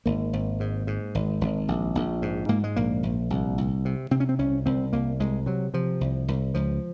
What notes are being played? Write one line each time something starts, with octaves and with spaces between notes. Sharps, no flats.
G#1 A#3
G#1
G#2
G#2
G#1
G#1
A#1
A#1
G#2
G#2 A#3
G#3
A#1 A#3
A#1
C2
C2
C3
C3 C4
C#4
C4
C2 C#4
C2 C4
C2 A#3
C2 G#3
C3 F#3
C3 F3
C2
C2
C#2 F3